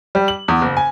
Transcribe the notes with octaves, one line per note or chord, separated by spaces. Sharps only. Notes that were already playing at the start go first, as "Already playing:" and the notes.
G3
F#7
E2
F#1
G#5